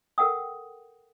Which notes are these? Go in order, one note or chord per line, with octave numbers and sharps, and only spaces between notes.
A4 A#4 F#5 G5 D#6